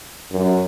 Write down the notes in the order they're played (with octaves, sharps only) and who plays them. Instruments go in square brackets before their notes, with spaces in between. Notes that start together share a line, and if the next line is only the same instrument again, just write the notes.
[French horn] F#2